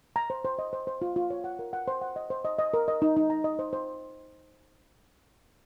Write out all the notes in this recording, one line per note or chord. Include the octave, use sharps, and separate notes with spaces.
A#5
C5
C5
D#5
C5
C5
F4
F4
C#5
F#5
A#4
F#5
C5
F#5
D#5
C5
D#5
D#5
A#4
D#5
D#4
D#4
A#5
D#5
C5
C5